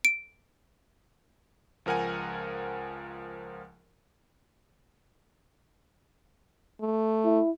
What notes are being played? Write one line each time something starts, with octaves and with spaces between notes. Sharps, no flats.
D7
C#2 F3 A#4 F#5 G#5
A3
E4